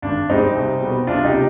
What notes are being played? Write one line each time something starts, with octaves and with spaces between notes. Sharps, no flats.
G#1 D4
G#2 G3 C4 D#4
C2
B2 G3 B3
C2 D4 F4
D#4 G4
C3